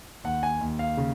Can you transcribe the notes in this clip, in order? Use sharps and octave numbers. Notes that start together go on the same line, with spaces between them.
D#2 F#5
G#5
D#2
F5
C#3